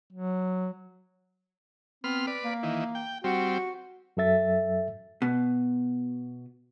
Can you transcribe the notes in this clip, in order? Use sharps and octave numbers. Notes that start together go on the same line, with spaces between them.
F#3
B3 C4 C6 F6
B4 D5
A#3
D#3 E3
G5
G3 C4 F#4
F#2 F#3 A4 E5 A6
B2